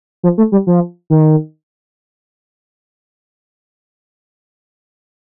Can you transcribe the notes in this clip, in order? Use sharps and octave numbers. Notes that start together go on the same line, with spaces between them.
F3
A3
G3
F3
D#3